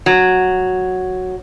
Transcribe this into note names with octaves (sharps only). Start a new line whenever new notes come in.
F#3